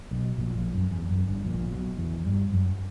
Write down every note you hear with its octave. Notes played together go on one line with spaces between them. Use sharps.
B1 B2
A#1 A#2
A#1 A#2
F#2
E2
F#2
G1 G2
A#1 A#2
B1 B2
E2 E3
G2 G3
F#2 F#3